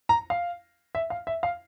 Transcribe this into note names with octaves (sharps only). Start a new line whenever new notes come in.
A#5
F5
E5
F5
E5
F5